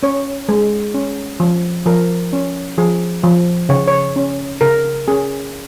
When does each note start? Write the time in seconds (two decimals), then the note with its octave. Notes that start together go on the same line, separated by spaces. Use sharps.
0.03 C#4 C#5
0.49 G#3
0.94 C#4
1.40 F3
1.86 F3 A#4
2.33 C#4
2.78 F3 G#4
3.23 F3
3.69 C#3 C#5
3.88 C#5
4.16 C#4
4.61 C#3 A#4
5.08 C#4 G#4